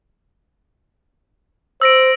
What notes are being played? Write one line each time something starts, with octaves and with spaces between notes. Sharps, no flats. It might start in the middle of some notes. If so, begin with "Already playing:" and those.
C5 E6 A#6 D7